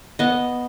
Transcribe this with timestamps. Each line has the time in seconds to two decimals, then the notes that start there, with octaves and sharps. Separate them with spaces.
0.19 B3 D#5